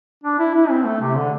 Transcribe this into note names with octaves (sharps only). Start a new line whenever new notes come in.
D4
E4
E4
C4
A3
C3
D3